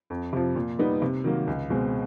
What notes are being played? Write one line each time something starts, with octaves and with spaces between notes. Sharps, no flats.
F2
C3 F3
A#2
G3 B3 D#4
C3
D#3 F#3 A#3
C#2
B2 G#3 C4